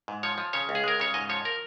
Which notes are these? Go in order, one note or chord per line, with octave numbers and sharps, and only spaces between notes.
G#2
F3 C#5
F3
C#3 C#5
C#2
G#4
G#3 A#4
C#3 C#5
G#2 D#5
F3 C#5
A#4